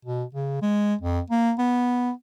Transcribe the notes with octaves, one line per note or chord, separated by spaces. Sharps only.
B2
C#3
G#3
F2
A#3
B3